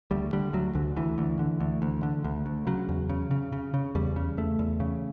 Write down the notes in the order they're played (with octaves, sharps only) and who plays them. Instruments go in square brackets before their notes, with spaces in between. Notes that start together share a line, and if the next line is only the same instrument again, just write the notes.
[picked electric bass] D2 G3
D3 G3
D2 F#3
D2 D3
D2 E3
D2
D3
D2
D2
D3
D2
D2
C#3 F#3
E2
C#3
C#3
C#3
C#3
E2 G3
C#3
E2 A3
E2
C#3